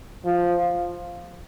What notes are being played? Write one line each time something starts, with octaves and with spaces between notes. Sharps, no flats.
F3